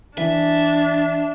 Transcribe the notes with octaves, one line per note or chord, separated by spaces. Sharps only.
E3 D4 E5